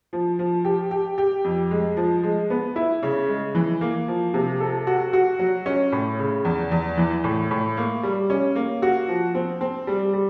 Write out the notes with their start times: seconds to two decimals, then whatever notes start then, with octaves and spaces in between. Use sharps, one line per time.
0.13 F3
0.39 F3
0.65 G4
0.91 G4
1.18 G4
1.44 F2
1.71 G#3
1.97 F3
2.23 G#3
2.50 B3
2.76 E4
3.03 C#3
3.28 G#3
3.55 E3
3.81 A#3
4.08 F3
4.34 C3
4.60 A4
4.87 F#4
5.13 F#4
5.39 F#3
5.66 C#4
5.92 A2
6.19 C#3
6.45 E2
6.71 E2
6.98 E3
7.24 A2
7.51 A2
7.77 A#3
8.03 G3
8.30 C#4
8.56 A#3
8.82 F#4
9.08 F3
9.35 C4
9.61 C4
9.87 G3
10.13 G3